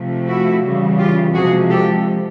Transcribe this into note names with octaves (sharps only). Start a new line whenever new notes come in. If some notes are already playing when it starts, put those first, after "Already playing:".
Already playing: C3 F3 A3
E4 F#4
C#3 E3 G3
F4 G4
C3 F3 G#3 F#4 G#4
G4 A4